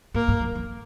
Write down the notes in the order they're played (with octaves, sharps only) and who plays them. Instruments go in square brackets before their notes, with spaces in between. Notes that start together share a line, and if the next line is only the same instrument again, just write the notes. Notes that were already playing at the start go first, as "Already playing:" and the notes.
[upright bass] G#2 [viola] A#3
[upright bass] G#2
F3
F3